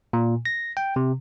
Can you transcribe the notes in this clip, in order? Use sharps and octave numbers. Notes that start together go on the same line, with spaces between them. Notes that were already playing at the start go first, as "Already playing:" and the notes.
A#2
A#6
G5
C3